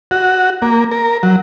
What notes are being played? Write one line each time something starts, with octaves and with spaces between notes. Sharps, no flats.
F#4
A#3
A#4
F#3